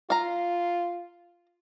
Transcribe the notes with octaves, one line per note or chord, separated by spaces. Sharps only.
F4 F5 A#5